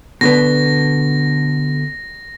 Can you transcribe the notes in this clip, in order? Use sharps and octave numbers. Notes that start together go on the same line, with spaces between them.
B2 D3 B3 A#6